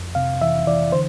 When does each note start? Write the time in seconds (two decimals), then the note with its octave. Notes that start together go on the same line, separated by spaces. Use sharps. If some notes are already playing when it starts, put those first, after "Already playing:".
Already playing: F2
0.15 C3 F5
0.42 E3 E5
0.67 E3 D5
0.92 D3 C5